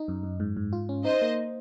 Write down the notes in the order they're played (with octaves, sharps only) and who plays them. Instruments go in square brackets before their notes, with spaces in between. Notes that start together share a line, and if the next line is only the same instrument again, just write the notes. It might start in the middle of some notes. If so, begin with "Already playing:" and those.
Already playing: [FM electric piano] D#4
F#2
F#2
G#2
G#2
F4
C#4
[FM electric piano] D#4 [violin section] C5 D#5
[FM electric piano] A#3